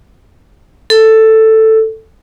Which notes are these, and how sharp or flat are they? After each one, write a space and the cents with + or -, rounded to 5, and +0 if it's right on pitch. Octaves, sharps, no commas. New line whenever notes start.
A4 +5